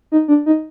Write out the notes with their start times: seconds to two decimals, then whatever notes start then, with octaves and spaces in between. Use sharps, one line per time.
0.12 D#4
0.28 D4
0.46 D#4